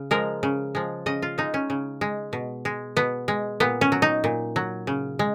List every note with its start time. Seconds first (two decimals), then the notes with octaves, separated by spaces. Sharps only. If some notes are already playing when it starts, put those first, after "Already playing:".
Already playing: C#3
0.11 F3 G#3 A#4
0.43 C#3
0.75 F3 G#3
1.06 C#3 D#5
1.22 F4
1.38 G#3 D#4
1.54 C#4
1.70 C#3
2.01 G#3
2.33 B2
2.65 G#3
2.97 B2 B3
3.28 G#3
3.60 A#2 B3
3.81 C#4
3.92 F#3
4.02 D#4
4.24 A#2
4.56 F#3
4.87 C#3
5.19 G#3